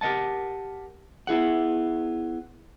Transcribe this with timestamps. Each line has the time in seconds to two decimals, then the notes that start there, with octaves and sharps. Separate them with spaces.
0.01 G4 A#4 D#5 F#5 A5
1.27 B3 E4 G#4 F#5